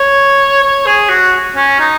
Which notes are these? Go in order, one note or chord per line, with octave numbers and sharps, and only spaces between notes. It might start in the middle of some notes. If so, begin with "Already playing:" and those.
Already playing: C#5
C#5
G#4
F#4
C#4
D#4